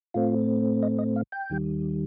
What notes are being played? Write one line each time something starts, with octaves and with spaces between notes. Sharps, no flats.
A2 A3 C4 F4
D#5
D#5
F5
G5
D#2 D#3 G3